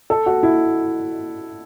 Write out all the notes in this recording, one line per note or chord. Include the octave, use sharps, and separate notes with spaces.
A4
F#4
E4